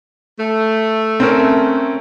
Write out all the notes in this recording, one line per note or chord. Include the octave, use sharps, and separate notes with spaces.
A3
C4 C#4 A#4